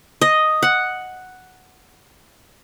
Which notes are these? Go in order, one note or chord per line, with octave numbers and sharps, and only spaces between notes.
D#5
F#5